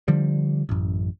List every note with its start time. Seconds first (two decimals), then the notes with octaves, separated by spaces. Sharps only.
0.08 D3 F3 G3
0.69 A1 F#2